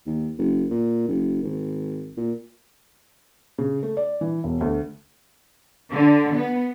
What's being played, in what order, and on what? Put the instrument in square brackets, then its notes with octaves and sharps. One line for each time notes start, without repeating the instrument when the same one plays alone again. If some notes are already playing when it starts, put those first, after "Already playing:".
[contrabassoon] D#2
F#1
A#2
F#1
G#1
A#2
[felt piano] C#3
A3
D5
E3
E1
D2
[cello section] D3
B3